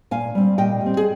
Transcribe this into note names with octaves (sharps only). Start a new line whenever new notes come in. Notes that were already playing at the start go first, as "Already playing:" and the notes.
A#2 F5 G#5
G3 C4
A#2 D#5 G5
G3
C4
G#4